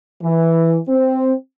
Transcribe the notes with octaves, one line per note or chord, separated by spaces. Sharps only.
E3
C4